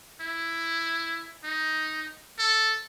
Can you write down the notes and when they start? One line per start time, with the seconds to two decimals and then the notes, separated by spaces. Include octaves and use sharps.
0.20 E4
1.44 D#4
2.39 A4